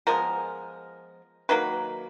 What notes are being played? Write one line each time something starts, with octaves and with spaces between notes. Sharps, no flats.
F3 G#3 B3 A#4
D#3 F#3 A#3 B4